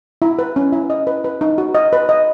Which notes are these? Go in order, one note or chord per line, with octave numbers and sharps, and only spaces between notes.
E4
B4
C#4
E4
D#5
B4
B4
D#4
F#4
D#5
B4
D#5